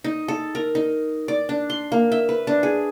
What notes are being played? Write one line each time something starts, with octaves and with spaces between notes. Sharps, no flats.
D#4
A4
A#4
D#4
D5
D4
C6
A#3
E5
B4
D4
G#4